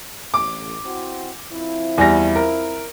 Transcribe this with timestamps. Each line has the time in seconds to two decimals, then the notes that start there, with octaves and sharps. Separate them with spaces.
0.34 A1 D6
0.85 C4 E4 F#4
1.51 F3 C4 E4
1.98 E2 G3 A#6
2.36 A#4